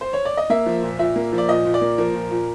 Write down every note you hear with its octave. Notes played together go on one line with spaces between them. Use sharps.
C5
C#5
D5
D#5
A#3 E5
F3
A#2
A#2 E5
A#3
F3
D5
A#2 D#5
A#2
D5
A#3
F3 A#4
A#2
A#2